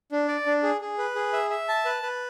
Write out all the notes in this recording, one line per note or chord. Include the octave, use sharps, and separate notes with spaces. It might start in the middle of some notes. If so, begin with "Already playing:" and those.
D4
D5
D4
G#4
G#4
B4
G#4
E5
E5
A5
B4
B4